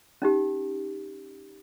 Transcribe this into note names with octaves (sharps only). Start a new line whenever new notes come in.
C#4 D#4 G4